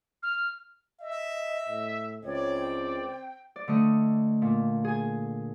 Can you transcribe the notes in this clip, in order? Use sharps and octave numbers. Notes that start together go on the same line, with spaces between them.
F6
D#5 E5
A2
C#2 C4 C#5 D5
G5
D5
D3 A3 D#5
A#2
G#4 G#5